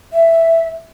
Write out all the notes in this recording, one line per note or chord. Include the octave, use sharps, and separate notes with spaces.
E5